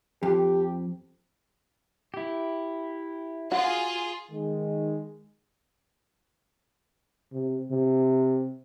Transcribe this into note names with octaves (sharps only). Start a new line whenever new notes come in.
F2 G4
E4 G4
F4 F#4 G#4
D#3 G#3
C3
C3